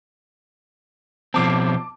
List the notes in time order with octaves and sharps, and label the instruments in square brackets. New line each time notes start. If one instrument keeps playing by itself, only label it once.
[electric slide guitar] B2 F3 C4 [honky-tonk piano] A5 D6